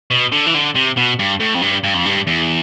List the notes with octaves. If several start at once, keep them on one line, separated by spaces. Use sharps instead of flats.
B2
D3
E3
D3
C3
B2
G2
A2
F2
G2
G2
F2
G2
E2